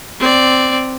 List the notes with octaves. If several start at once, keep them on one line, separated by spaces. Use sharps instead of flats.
C4 D5